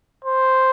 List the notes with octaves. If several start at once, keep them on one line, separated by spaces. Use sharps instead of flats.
C5